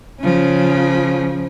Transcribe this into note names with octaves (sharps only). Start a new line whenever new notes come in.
C#3 F3